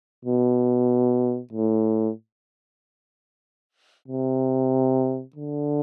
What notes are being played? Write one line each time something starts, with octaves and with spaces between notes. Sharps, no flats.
B2
A2
C3
D3